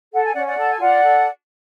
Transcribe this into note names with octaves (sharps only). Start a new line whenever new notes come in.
A4 F#5
G#5
C#4 D5 F#5
D5 F#5
A4 A5
G#5
F4 D5 F#5
A4